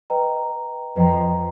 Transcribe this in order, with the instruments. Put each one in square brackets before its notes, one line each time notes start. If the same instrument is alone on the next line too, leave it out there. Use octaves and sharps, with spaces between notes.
[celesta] B4 D#5 G5 A#5
[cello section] F2 F3 [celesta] B4 D#5 G5 A#5